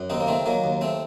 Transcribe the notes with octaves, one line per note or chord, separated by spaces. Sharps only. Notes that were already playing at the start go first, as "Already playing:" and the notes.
Already playing: F#2
D#2 C4 D#4
A#3
D#3 A3 C4
D#3 F#3 A#3
D#2
A3 C4